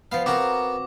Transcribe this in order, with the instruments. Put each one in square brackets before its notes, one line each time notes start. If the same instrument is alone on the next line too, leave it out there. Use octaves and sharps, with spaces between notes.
[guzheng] F3 B3 [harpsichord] F5
[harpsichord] B3 A#4 [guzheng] C4 F#4 [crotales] D6